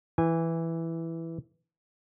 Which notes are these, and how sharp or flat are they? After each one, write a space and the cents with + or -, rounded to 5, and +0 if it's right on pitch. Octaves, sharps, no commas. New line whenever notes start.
E3 +0 G#5 -20